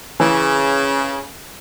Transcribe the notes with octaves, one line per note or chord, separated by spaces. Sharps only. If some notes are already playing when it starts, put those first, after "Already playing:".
C#3 E3